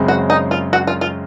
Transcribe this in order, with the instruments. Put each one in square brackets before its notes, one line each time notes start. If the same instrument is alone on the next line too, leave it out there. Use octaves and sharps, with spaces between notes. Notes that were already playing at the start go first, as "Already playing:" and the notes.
Already playing: [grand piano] F#2 C#3 G#3 C4
[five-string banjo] F#4
D#4
F4
F#4
F4
F4